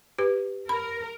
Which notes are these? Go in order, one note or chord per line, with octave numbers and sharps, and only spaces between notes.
G4 B4
A#4 B5